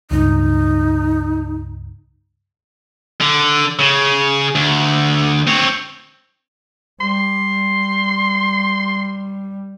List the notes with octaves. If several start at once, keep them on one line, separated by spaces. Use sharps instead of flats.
C#2 G2 D#4
D3
C#3
D2
C4 C#5
G3 C6